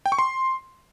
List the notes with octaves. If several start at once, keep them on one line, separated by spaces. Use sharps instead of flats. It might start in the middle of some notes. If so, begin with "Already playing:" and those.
G5
C#6
C6